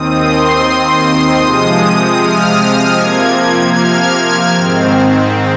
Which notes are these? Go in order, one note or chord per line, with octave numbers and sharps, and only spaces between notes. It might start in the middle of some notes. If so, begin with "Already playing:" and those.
Already playing: D#2 D#3 C4 D#6
C6
C6
C3 F3 G#3 D#6
F6
C3 F3 A#3 G#6
F6
G#2 D#3 C4